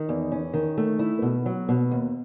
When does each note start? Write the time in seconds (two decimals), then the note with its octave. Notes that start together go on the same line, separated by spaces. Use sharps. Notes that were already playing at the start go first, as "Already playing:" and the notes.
Already playing: D#3
0.09 E2
0.32 C#4
0.54 D#3
0.78 A3
0.99 E4
1.22 B2
1.46 F#3
1.69 B2
1.91 D#2